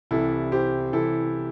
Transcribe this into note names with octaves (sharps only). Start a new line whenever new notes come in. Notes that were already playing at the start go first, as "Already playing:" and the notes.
C2 C3 E3 G3 E4 A4
G4 C5
C2 C3 E3 G3 E4 A4